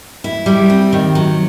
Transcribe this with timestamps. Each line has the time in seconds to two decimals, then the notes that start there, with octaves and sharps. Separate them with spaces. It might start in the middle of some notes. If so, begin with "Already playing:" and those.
0.24 E4
0.46 G3
0.70 C4
0.93 D#3
1.15 F#3